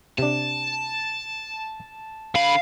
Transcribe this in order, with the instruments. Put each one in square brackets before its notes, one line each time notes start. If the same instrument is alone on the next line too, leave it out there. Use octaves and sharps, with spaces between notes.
[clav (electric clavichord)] C3 D4 [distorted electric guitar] A5
[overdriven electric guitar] D3 B5 [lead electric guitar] F5